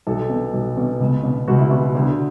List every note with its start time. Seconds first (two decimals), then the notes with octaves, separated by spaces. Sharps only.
0.07 B1 A4
0.30 B2
0.53 B1
0.77 B2
1.00 C#2
1.23 B2
1.48 C#2 F#4
1.59 E4
1.71 B2 F#4
1.95 D2